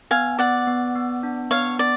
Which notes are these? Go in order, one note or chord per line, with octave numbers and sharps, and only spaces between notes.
B3 F5 G#5
B3 D5 F#5
B3
B3
D4
B3 C#5 F5
B3 D5